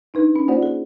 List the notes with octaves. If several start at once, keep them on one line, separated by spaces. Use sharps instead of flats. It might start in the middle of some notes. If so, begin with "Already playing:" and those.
D4 D#4 B4
C#4
A#3 F4 C5 D5 F#5
G#4